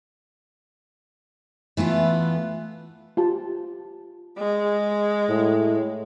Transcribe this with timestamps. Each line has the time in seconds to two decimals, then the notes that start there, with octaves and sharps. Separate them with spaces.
1.77 E3 A3 B3 F4
3.17 F4 G4 A5
4.38 G#3
5.29 A2